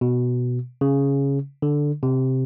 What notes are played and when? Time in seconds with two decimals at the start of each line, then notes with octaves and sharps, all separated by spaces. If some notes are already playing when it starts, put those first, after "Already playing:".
0.01 B2
0.81 C#3
1.62 D3
2.03 C3